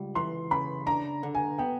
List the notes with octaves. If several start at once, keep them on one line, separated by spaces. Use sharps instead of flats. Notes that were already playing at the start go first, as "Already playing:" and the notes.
Already playing: C#2 G3
E3 C6
C#3 B5
D4 A#5
D3
G#5
B3 G5